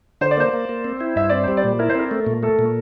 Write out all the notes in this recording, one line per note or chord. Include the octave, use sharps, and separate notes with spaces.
D3 C5
D5
A#3 C5
A#3
A#3
C4
E4
G2 E5
C4 D5
G3 C5
D5
A#2
E4 A#4
C5
C4 A#4
A3
A#2
A3 A4
A#2